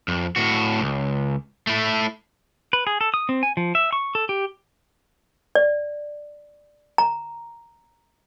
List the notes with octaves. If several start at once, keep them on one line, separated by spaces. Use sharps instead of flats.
F2
A2 F#4
C#2
A3 E4
B4
G#4
A4
D#6
C4
G#5
F3
E5
C#6
A4
G4
D5
A#5